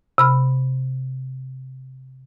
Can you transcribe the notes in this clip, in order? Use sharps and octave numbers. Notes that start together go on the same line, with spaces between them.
C3 B5 F6